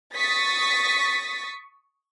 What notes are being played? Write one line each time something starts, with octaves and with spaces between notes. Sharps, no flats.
C#6 D#6 A6 B6